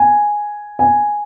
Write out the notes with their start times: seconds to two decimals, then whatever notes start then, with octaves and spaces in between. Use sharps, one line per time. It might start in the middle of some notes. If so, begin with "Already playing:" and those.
Already playing: G#5
0.79 G#5